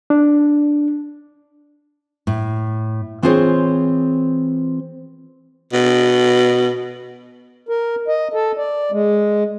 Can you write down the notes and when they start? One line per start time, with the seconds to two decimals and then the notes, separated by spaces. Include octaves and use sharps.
0.10 D4
2.27 A2
3.23 E3 C4 F4 G#4 C5 C#5
5.73 B2
7.69 A#4
8.08 D#5
8.34 A4
8.57 D5
8.92 G#3